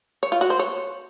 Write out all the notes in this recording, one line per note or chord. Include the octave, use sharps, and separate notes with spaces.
C#5
F4
F#4
C5
C#5